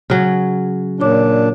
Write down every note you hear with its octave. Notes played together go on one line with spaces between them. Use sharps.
C#3 F#3
A#2 D4 F4 C#5 D6